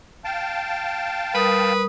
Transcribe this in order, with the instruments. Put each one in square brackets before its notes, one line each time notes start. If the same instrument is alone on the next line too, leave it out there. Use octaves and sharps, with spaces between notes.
[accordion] F5 G5 A5
[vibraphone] G3 A#4 D#6 [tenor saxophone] B4